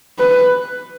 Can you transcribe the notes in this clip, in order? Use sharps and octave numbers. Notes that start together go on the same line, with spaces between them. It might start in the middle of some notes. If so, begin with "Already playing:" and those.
B4